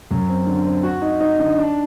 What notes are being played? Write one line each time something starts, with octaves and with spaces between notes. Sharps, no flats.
F#2
C4
D3
C4
F#4
D#4
D#4
D3
D4